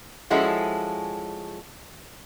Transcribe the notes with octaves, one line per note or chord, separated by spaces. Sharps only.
F3 G#3 C#4 E4 F#4 A4